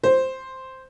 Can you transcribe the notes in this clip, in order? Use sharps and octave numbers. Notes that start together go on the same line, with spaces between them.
C5